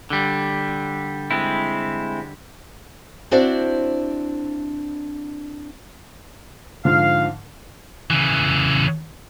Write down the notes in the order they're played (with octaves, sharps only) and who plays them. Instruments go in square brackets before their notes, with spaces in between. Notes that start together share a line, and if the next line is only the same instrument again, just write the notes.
[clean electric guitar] D3 G3
[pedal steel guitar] G#3 C4 E4
[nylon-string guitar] C4 D4 E4 F#4 C5 D5
[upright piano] G#2 D3 F3 [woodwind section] F5
[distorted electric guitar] C#3 E3